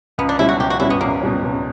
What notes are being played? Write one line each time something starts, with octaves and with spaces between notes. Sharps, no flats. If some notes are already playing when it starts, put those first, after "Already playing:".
C#2 B3
D4
B2 G3 C#4 E4
F#4
C#2 G4
F#4
B2 G3 C#4 E4
B3
C#2 A#3
B2 G3 C#4
C#2